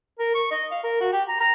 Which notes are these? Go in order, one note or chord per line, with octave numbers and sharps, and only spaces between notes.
A#4
C#6
D#5
F5
A#4
F#4
G4
A#5
A#5